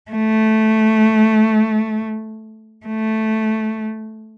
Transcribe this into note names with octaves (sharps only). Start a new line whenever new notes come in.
A3
A3